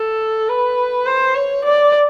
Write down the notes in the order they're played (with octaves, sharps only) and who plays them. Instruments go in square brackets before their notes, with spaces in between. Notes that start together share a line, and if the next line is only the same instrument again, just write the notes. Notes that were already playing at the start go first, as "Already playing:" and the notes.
Already playing: [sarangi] A4
B4
C5
C#5
D5